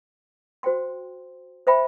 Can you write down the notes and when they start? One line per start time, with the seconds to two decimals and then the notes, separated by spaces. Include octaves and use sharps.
0.63 F#4 C5 G5 C6
1.67 C5 E5 G5 B5